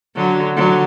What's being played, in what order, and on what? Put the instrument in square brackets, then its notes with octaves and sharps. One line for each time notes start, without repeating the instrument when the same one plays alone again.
[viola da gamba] D3 F#3
D3 F#3